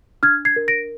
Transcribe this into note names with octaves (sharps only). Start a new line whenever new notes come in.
D4 F6 G#6
G#6 C7
A#4
A#6 D7